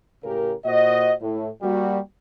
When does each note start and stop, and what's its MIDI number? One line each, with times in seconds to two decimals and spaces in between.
0.24 0.53 45
0.24 0.53 49
0.24 0.53 67
0.24 0.53 70
0.65 1.13 46
0.65 1.13 66
0.65 1.13 72
0.65 1.13 75
1.21 1.49 45
1.62 1.99 55
1.62 1.99 58
1.62 1.99 66